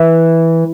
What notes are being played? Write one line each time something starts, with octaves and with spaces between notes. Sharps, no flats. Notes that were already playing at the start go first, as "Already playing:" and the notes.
Already playing: E3